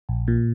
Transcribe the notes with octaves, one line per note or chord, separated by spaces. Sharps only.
A#1
A#2